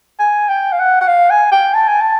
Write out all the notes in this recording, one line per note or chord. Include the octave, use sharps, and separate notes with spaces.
G#5
G5
F5
F#5
F#5
F5
G#5
G5
A5
G#5
A5